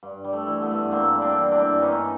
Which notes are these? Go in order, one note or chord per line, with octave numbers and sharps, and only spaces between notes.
G2
G3
A3
E3
A3 B3
G2
G2 A#3 C4
G3
C4 D4
E3
C4 D4
G2
G2 C#4 D#4